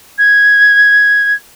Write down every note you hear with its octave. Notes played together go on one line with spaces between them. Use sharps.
G#6